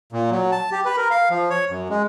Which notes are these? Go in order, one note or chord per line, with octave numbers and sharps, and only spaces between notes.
A#2
F#3
A5
G4
B4
A#4
F5
F3
C#5
F#2
G#3